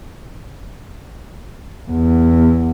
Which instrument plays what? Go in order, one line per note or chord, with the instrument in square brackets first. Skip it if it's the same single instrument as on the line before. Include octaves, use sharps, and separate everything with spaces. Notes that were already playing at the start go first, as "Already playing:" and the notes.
[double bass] E2